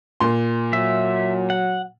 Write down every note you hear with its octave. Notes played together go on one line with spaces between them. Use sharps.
A#2 C6
F#3 E5
F#5